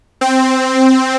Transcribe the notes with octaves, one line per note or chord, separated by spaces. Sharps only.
C4